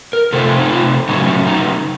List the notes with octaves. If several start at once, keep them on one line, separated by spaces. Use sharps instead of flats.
A#4
C3 F3 A3 C4 A4
D#4
F4
C#3 F#3 A3 C#4 D#4
C#4
D#4